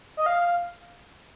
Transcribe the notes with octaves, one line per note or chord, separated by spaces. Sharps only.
D#5
F5